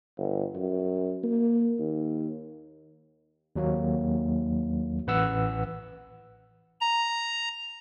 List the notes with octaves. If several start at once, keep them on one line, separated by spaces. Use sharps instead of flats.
G1
F#2
A#3
D#2
D#2 F#3 A#3
A1 B4 F#5 E6
A#5